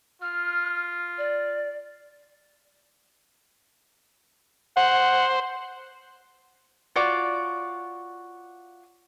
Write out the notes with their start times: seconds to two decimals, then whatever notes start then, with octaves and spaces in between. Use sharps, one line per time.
0.22 F4 F6
1.18 D5
4.77 C5 F#5
6.96 F4 F#4 C#5 D5